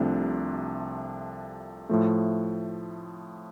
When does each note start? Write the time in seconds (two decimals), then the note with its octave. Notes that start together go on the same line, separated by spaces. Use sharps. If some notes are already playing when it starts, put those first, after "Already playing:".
Already playing: C2 C3 F3 A3 D4
1.89 A2 F3 A3